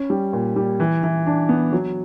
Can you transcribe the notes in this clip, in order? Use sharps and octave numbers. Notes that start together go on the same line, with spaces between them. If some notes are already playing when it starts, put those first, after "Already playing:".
Already playing: C#4
G3
A#2
G3
E3
E3
D4
B3
F#3